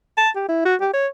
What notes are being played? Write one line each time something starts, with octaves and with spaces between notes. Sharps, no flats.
A5
G4
E4
F#4
G4
C#5